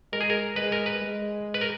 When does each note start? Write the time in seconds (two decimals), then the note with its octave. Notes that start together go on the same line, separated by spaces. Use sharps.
0.12 G#3 A#4
0.21 G#4
0.30 A#4
0.56 G#3 B4
0.72 A#4
0.86 B4
1.01 G#3
1.54 B4
1.61 A#4